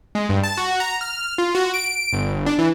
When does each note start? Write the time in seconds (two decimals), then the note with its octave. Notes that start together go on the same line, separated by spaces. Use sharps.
0.15 G#3
0.29 G2
0.43 A5
0.57 F#4
0.80 A#5
1.01 F6
1.38 F4
1.55 F#4
1.74 D7
2.13 G1
2.46 D4
2.58 E3